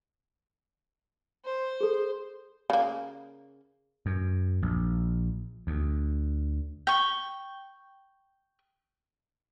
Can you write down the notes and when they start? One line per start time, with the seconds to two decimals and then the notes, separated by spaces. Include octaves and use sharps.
1.45 C5
1.81 G#4 A4
2.70 C#3 A#3
4.06 F#2
4.62 A#1
5.67 D2
6.87 G5 C#6